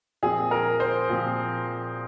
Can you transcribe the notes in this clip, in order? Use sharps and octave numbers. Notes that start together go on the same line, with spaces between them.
A#2 F3 C4 G#4
A#4
C5
A#2 F3 C4